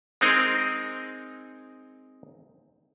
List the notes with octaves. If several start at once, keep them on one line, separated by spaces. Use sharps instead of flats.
G#3 C4 D#4 G#4 A#4